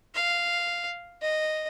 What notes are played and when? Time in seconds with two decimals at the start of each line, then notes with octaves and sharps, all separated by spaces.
0.15 F5
1.22 D#5